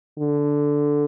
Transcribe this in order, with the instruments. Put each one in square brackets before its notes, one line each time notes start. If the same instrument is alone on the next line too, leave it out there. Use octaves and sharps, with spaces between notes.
[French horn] D3